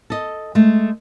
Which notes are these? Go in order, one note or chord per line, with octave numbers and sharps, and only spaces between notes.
A4 D#5
G#3 A3